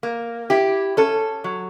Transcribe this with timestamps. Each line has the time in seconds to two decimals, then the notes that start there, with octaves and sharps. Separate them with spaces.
0.03 A#3
0.50 E4 G4
0.97 C#4 A4
1.44 F#3